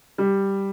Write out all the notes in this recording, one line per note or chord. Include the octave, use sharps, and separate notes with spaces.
G3